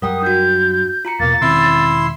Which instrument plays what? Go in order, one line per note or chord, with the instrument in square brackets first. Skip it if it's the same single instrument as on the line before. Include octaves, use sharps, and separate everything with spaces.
[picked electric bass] F#2 G3 [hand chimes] A#4 F#5 G5 [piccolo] D#6
[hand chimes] D4 F#4 [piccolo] G6
[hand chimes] F4 A#5 C#7
[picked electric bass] E2 B2 [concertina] A#3 [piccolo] A6
[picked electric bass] E1 D#3 C#4 [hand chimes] C4 [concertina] E4 C6 E6